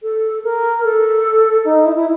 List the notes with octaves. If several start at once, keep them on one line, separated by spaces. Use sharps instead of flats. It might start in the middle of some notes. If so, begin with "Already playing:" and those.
A4
A#4
A4
D#4
E4
E4